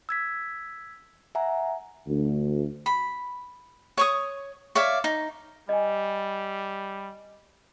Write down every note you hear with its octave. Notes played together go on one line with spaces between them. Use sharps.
E6 G#6 B6
E5 F#5 G#5 A#5
D2
B5
C#5 C#6 D#6
C#5 D5 E5 F5
D#4
G3 D#5 G#5